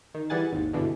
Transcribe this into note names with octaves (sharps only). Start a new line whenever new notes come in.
D#3
E3 G3 G#4 F#5 G#5 A6
G#1 D#2
G2 B2 D3 E3